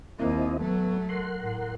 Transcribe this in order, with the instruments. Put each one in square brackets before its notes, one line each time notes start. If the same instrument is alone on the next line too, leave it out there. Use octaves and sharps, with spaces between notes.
[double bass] D#2 A#3 [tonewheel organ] C4 E4 D#5
[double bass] F#3 A3 [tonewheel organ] B3
[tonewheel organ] A#4 F#5 C6
[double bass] A2